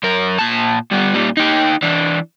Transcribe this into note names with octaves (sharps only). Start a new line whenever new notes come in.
F#2 A#4
A#2 A5
G2 B3
A#2 G3
D#4 G4
E3 D4